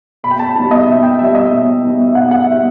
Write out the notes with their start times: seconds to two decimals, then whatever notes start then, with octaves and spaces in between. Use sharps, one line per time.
0.23 B2 B5
0.31 G5
0.39 A5
0.55 G3 B3 D#4 A5
0.71 D#5
0.87 B2 E5
1.03 G5
1.19 G3 B3 D#4 E5
1.35 D#5
1.51 B2 E5
1.83 G3 B3 D#4
2.08 E5
2.15 B2 F#5
2.31 F#5
2.46 G3 B3 D#4 E5